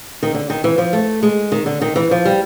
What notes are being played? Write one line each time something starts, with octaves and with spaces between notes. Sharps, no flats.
D#3
D3
D#3
E3
F3
A3
G#3
D#3
D3
D#3
E3
F3
G3